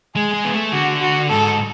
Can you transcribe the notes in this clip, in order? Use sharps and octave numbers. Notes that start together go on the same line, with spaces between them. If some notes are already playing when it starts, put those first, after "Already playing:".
G#3 G#4
G#3
B3
A3
D3 F#4
F#4
G#2 A4